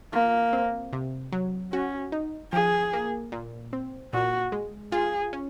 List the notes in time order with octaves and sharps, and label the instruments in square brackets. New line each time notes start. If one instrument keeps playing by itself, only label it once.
[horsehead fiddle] A#3 [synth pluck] F4
[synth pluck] C4
C3
F#3
[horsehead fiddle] C#4 [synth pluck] F#4
[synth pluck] D#4
[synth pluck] F3 [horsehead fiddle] G#4
[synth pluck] A#3
A#2
C4
[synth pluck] A#2 [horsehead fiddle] F#4
[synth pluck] G#3
[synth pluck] F4 [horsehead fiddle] G#4
[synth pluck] C#4